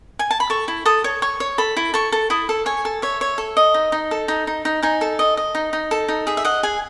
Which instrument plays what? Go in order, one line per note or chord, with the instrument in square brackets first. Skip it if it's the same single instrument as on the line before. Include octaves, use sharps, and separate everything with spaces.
[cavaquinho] G#5
A5
B5
A4 C#6
E4
A4 D#6
C#5
C#5 C#6
C#5
A4 B5
E4
A4 C#6
A4
E4 D#6
A4
C#5 G#5
A4
C#5 E5
C#5
A4
D#5
D#4
D#4
A4
D#4
D#4
D#4
D#4 G#5
A4
D#5
D#5
D#4
D#4
A4
D#4
G#4 E5
E5
D#5 F#5
G#4 G#5